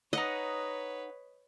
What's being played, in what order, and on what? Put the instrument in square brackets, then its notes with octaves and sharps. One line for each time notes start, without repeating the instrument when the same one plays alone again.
[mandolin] D#4 F#5 F#6 [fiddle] B4 C#5 [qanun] D#5